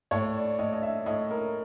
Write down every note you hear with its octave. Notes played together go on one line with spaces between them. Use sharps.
A2 C#5
D5
A2 D#5
D#5
E5
A2 D#5
A#4